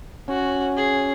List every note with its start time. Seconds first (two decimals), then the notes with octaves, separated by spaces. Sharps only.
0.28 C#4 F#4
0.77 G#4